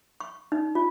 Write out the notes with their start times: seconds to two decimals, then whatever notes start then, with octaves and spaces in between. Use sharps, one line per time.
0.20 C#6
0.52 D#4
0.75 F4